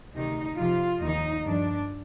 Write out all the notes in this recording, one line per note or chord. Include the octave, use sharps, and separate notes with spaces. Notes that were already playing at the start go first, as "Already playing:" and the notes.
D2 C3 D#3 D#4
F2 C3 F3 F4
D#2 D#3 D#4
G2 F3 D4